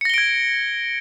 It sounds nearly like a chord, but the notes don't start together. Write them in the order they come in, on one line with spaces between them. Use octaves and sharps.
C#7 A#6 G7 D7 G#6